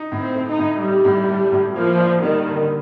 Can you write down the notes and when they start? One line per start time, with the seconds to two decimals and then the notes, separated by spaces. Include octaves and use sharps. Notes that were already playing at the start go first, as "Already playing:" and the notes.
Already playing: D#4
0.12 A2
0.19 C4
0.34 A3
0.50 D#4
0.58 A2
0.81 G3 D#4
1.05 A2
1.28 A3
1.52 A2
1.76 F3 A#3
2.00 D4
2.23 D#3 G3
2.46 D3